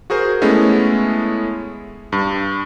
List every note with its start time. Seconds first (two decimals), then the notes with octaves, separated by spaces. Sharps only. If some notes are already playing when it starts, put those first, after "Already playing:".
0.10 F#4 G#4 A#4 C5
0.41 G#3 A3 B3 C#4 E4
2.12 G2